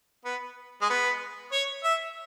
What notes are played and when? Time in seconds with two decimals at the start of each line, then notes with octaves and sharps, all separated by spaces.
0.25 B3
0.82 G#3
0.90 B3
1.52 C#5
1.84 E5